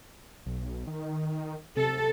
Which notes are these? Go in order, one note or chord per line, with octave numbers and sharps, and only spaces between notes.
B1
D#3
C3 A4